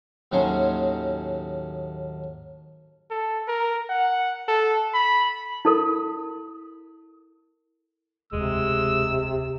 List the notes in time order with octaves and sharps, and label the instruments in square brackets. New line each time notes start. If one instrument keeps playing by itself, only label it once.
[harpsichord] D#2 A2 F#3 C#4 G#4 C5
[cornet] A4
A#4
F#5
A4
B5
[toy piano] E4 A4 A#4
[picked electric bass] E1 D2 [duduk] C3 [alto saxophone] G#3 [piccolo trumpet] E6